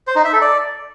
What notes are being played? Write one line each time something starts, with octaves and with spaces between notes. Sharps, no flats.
C5
D#4
E5
A4
D5